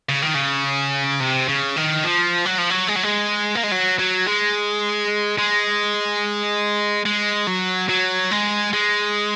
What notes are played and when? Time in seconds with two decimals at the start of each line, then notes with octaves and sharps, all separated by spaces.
0.09 C#3
0.22 D#3
0.35 C#3
1.20 C3
1.48 C#3
1.76 D#3
2.04 F3
2.46 F#3
2.58 F3
2.70 F#3
2.88 G#3
2.96 F#3
3.03 G#3
3.55 A#3
3.63 G#3
3.71 F#3
3.99 F#3
4.27 G#3
5.38 G#3
7.06 G#3
7.47 F#3
7.89 F#3
8.31 G#3
8.73 G#3